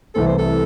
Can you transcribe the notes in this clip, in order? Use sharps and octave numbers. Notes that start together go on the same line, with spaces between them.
C2 C3 E3 A3 C4 A4
C5
A4